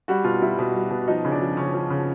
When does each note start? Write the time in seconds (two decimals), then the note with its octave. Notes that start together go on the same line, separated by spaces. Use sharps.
0.08 G3 F#4
0.24 B2 F4
0.42 G3 E4
0.59 B2
0.74 G3
0.90 B2
1.08 F3 D#4
1.25 C#3
1.32 D4
1.41 F3
1.57 C#3 C#4
1.74 F3
1.90 C#3